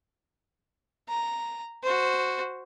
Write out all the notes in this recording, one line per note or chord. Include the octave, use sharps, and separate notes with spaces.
A#5
F#4 C5